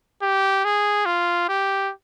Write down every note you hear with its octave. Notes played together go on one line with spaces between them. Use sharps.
G4
G#4
F4
G4